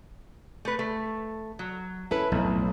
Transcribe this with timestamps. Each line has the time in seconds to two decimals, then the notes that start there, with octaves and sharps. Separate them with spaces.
0.65 A3 B4
0.79 A3
1.59 F#3
2.11 C#4 E4 A4 B4
2.32 B1 F2 A2 A3